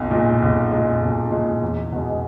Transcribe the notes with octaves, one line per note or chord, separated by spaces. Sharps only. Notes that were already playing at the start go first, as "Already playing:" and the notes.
Already playing: B1 A#2
A#2 G#3
B1
A#2 G#3
B1
A#2 G#3
E2
B2 G#3